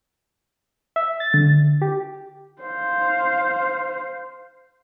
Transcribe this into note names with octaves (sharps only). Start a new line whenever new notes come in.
E5
A6
D3
G4
C5 F5